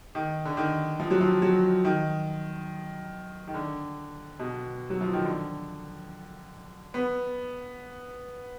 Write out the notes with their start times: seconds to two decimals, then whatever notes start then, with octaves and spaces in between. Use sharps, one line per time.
0.15 D#3
0.45 D3
0.57 D#3
1.00 F3
1.10 F#3
1.21 F3
1.42 F#3
1.85 D#3
3.47 D#3
3.54 D3
4.39 B2
4.90 F#3
5.01 F3
5.13 D#3
5.24 D3
6.94 B3